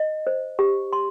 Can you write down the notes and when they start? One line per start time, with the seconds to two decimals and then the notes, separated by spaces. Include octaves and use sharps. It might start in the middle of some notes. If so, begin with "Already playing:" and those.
Already playing: D#5
0.27 C5
0.59 G4
0.93 C6